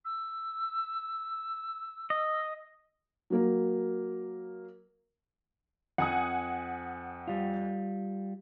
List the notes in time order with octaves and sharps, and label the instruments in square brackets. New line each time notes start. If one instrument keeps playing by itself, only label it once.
[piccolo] E6
[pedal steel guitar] D#5
[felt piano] F#3 A#3 A#4
[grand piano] F2 [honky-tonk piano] F#5 G#5 D#6
[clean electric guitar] G3 F4